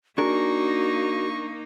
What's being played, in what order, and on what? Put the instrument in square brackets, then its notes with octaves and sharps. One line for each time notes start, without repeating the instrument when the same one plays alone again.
[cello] A#3 D#4 [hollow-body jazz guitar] D4 G#4 A#4 [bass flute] F#4 [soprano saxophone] C#6